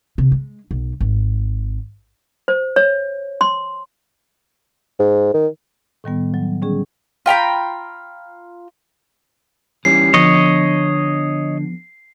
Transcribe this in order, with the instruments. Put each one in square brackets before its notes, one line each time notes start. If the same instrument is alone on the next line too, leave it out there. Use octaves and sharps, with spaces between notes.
[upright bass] C3
G#3
B1
G#1
[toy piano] C5
C#5
C6
[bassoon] G#2
D#3
[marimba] A2 D#3 G3 B3
F#3
D3 G3 C#4 G#4
[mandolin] F4 G5 A#5 B5
[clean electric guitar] E3 G3 C#4 [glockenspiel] C7
[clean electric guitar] D3 [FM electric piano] F3 B3 [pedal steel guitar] C#5 D#5